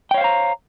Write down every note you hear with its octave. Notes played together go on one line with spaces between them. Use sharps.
C5 C#5 F5 G5 A#5